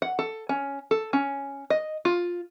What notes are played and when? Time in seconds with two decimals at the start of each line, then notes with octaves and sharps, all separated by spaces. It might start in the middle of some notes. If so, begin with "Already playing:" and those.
0.02 F#5
0.19 A4
0.49 C#4
0.91 A4
1.13 C#4
1.70 D#5
2.05 F4